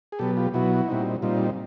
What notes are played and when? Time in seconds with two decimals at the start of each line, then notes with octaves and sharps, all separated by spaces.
0.12 G#4
0.19 B2 F#3 B3 G4 A4
0.37 F4 G4
0.54 B2 F#3 B3 E4 F#4
0.88 A#2 G3 C4 D#4
1.22 A#2 G3 C4 D#4 F4